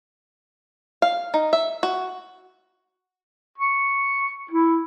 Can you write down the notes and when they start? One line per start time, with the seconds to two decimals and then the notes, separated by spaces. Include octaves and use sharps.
1.02 F5
1.34 D#4
1.53 E5
1.83 F#4
3.58 C#6
4.51 E4